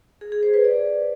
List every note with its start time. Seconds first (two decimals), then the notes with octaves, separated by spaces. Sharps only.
0.21 G#4
0.32 G#4
0.43 C5
0.54 B4
0.64 D5